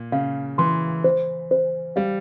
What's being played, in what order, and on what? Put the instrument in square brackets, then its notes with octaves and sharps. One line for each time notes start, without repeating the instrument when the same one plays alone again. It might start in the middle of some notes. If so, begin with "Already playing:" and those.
Already playing: [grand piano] A#2
[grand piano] C#3 [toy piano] F5
[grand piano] E3 [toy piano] C6
[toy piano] C5
C5
[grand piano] G3 [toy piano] F5